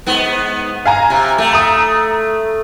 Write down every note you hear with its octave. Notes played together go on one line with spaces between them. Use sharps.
G#2 B3
F5 G#5 A#5
C3
A3
A#5 D#6